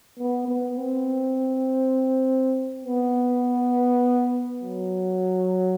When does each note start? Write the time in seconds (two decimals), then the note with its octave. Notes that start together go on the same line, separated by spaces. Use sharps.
0.19 B3
0.48 B3
0.77 C4
2.85 B3
4.62 F#3